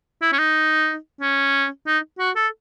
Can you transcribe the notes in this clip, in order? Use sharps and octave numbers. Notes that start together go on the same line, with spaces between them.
E4
C#4
D#4
C#4
D#4
F#4
A4